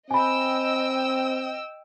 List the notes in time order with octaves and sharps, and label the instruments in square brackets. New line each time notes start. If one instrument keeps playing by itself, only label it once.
[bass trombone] C4 [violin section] D#5 G5 E6 [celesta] G#5 B5